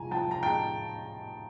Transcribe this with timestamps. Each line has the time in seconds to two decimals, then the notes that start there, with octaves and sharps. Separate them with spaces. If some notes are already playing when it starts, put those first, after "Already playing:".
Already playing: C2 F3 G#3 G#5 A#5
0.11 F3 G5 A5
0.31 A#5
0.43 G#3 G5 A5